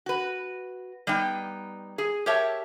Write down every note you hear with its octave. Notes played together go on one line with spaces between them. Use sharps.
F#4 B4
G3 B3 D#4 G5
G#4
G4 A#4 C#5 E5 A5